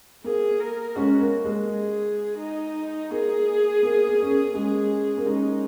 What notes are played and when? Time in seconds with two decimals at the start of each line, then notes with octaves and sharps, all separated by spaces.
0.24 A#3 G#4
0.60 A#4
0.96 G#3 C#4 F#4
1.20 A#3
1.45 G#3
1.68 G#4
2.39 D#4
3.11 A#3 G#4
3.83 A#3
4.07 A#3
4.22 C#4
4.31 A#3
4.54 G#3 C#4 G#4
5.17 A#3
5.26 G#3 C#4 D#4